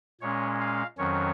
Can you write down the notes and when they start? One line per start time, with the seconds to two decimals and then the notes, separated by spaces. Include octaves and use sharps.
0.21 A#2 G#3 C#4 C#5
0.60 F5
0.98 F2 D#3 F#3 C#4 C#5